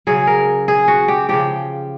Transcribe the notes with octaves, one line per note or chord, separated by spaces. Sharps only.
C#3 F#3 G#4
A#4
G#4
F#4
G4
C#3 F3 G4